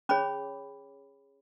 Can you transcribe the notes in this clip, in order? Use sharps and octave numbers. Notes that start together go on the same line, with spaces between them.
C#4 G#4 C#5 B5 D6